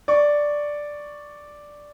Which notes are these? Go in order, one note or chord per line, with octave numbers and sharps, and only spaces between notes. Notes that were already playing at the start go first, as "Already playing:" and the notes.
D5 C#6